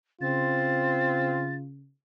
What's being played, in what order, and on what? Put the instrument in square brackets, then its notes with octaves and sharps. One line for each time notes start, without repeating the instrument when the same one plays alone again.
[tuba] C#3 [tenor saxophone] C4 [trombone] F4 [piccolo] A6